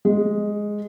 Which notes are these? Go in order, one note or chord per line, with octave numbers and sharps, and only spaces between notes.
G#3